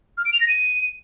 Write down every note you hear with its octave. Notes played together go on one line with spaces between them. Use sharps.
F6
D7
F7
A#6
D#7